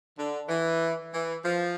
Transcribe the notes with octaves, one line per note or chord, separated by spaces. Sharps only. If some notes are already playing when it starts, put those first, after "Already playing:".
D3
E3
E3
F3